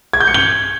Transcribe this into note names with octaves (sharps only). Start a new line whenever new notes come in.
G#6
G6
C#7
G7